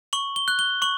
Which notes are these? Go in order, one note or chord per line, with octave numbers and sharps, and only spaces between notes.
C#6 F#7
G7
F#6
G7
C#6 F#7